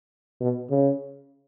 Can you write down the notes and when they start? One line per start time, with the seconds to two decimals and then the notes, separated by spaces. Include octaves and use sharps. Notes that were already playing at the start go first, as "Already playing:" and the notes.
0.41 B2
0.70 C#3